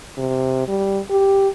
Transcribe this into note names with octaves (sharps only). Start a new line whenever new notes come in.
C3
G3
G4